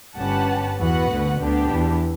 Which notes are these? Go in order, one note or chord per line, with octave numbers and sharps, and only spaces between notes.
G1 G2 C#4 G4 B4 F#5 A5
E2 E3 B3 F#4 B4 F#5
D2 D3
D2 D3 B3 D4 G4
E2 E3